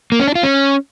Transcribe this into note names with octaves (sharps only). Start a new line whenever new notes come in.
A#3
C#4
D4
F4
C#4